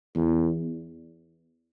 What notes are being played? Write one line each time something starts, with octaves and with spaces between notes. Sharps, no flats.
E2